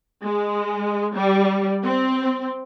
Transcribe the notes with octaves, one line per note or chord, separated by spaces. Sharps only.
G#3
G3
C4